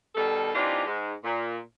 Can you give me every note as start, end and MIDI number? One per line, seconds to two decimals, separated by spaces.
0.15 0.51 47
0.15 0.51 51
0.15 0.51 55
0.15 0.51 69
0.55 0.86 52
0.55 0.86 60
0.55 0.86 62
0.55 0.86 63
0.55 0.86 65
0.55 0.86 67
0.86 1.13 44
0.86 1.13 56
1.24 1.58 46